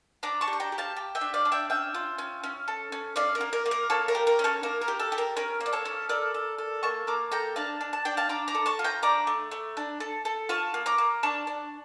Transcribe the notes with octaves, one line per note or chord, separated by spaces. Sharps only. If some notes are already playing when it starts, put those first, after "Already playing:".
D4 A#5 D6
A5 C#6
G4
C#6
G5 A#5
G4
F5 A5
G4
E5 G5
D4
D5 F5
D4
E5 G5
C#4 E5 G5
F4
C#4
C#4
A4
C#4
C#4 D5 F5
A#4
A#3
A#4
A#3
A#4
A#3 A4 C#5
A#4
G4
A#4
C#4
A4 C#5
A#3 A#4
A#4
G4
A4
G4
A#4
C#4 A#4
A#3
D5
A4 C#5
C#4
A4 A#4 D5
A4
A4
A#3 A5 C#6
A#3 A#5 D6
A4 G5 A#5
D4 F5 A5
D4
A5
D4 G5
F5 A5
D4 A#5 D6
A#5 D6
A4
A5 C#6
F4
G5 A#5
D4 A#5 D6
A3
A3
D4
A4
A4
F4 A5 C#6
A#3
A#5 D6
A#3
D4 A5 C#6
D4